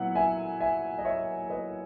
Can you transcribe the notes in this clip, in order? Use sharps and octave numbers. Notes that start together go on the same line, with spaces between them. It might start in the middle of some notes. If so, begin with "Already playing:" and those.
Already playing: A#2 F#3 B3 E4 F#5
E5 G#5
E5 G#5
D#5
C#5 E5
B4 D#5